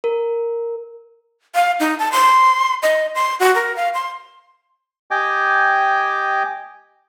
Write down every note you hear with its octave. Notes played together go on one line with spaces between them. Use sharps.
A#4
F5
D#4
A5
C6
D#5
C6
F#4
A#4
F5
C6
G4 D#5 G5 G#5 D6